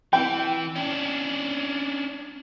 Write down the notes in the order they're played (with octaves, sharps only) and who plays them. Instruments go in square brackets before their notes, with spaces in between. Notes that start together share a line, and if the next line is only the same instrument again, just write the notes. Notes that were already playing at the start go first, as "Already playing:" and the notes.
[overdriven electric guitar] E3 [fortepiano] G5
[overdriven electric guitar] C#4 D4